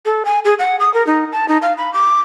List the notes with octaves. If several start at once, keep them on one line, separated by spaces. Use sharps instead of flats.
A4
G#5
G#4
F#5
D#6
A#4
D#4
A5
D#4
F5
B5
D6